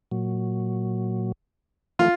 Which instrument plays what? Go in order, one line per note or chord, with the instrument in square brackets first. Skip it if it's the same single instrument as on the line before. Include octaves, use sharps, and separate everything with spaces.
[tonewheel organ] A#2 F#3
[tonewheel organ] E3 F3 A3 [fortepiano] F4